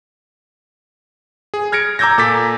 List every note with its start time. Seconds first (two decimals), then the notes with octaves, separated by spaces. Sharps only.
1.54 G#4
1.72 F6 G#6 A#6 C#7 D7
1.99 A#5 D6 E6 G6 G#6 A#6
2.18 A#2 A4 D6 A6 B6